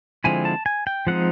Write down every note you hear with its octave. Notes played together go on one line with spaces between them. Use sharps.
D3 F3 G#3 C4 E4 G#5
A5
G#5
G5
F3 G#3 C4 D#4 F#5